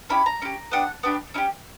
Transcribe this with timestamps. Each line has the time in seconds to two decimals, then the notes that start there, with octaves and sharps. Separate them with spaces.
0.09 C#4 E4 G4 B5
0.26 A#5
0.42 C#4 E4
0.45 G4
0.71 B3 D4 G4 F#5
1.03 B3 D4 G4
1.34 C#4 E4 G4